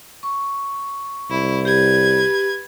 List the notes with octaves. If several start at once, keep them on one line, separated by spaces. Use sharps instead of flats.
C#6
C2 E4
G4 B4 G#6